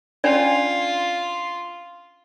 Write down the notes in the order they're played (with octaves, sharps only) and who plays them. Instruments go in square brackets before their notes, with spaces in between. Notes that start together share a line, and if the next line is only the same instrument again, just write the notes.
[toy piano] C#4 D4 D5 [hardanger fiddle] F4